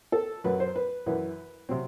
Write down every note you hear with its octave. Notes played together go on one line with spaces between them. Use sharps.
A4
F#2 F#3 B4
C5
B4
F#2 E3 B4
C3 F#3 C4